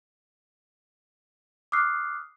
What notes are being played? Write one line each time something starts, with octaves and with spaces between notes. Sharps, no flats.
D6 D#6 F6 F#6 C7